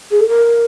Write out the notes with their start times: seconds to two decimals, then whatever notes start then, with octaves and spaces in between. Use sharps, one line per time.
0.11 G#4
0.20 A4
0.29 A#4